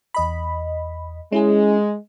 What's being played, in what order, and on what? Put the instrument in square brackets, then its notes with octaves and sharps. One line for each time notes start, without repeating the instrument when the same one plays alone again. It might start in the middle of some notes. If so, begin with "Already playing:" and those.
[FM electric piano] E2 D#5 B5
[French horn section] G#3 [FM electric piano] C#4 E4 G#4